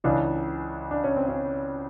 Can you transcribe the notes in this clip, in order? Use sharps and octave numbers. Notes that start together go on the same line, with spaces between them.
C#2 C#3 E3 D4
D4
C#4
C4
C#4